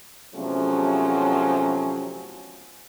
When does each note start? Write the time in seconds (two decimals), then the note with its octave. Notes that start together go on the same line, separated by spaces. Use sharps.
0.34 E2 C3 F3 F#3 A3 C#4